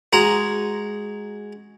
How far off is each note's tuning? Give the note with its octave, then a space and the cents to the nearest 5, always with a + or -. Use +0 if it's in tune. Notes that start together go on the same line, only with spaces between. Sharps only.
G#3 +0 F#4 +0 A#5 +0